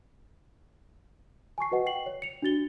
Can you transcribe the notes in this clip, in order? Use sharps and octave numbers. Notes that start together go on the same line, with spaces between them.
G#5 A5 C#6 C7
F#4 B4 D#5 F#5
G5 C7 F#7
C#5
C#7 F7
D4 F#4 A6 G7